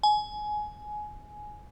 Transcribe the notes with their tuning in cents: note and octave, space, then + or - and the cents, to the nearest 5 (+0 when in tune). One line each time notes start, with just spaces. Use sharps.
G#5 +15